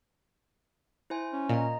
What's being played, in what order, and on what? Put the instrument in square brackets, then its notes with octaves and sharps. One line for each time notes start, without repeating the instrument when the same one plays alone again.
[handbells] E4 C5 G#5
[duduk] C#4
[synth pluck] A#2 [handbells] D#5 A#5